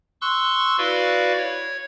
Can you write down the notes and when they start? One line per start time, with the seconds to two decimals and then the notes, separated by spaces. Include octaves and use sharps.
0.21 C6 C#6 E6 F#6
0.78 E4 F#4 B4 D5 F5
1.38 C#5